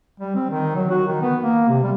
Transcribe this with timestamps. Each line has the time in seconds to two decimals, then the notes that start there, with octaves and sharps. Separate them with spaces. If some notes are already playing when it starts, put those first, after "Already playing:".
0.20 G3
0.35 C4
0.50 D#3
0.76 F#3
0.90 F#4
1.07 D#3
1.21 B3
1.41 A#3
1.68 C3
1.83 G3